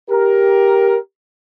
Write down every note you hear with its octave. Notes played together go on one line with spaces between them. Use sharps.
G4 A#4